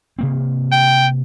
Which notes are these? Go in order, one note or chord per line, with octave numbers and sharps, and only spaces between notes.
C3 A#3 C4
G5